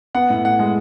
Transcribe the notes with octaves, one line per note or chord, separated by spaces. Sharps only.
B3 F#5
A2
A2 F#5
G#3